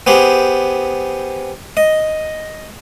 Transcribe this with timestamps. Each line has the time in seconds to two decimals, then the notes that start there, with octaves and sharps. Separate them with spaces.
0.07 B3 G4 G#4 C5
1.77 D#5